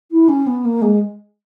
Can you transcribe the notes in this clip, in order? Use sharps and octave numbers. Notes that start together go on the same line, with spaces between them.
E4
C#4
B3
A#3
G#3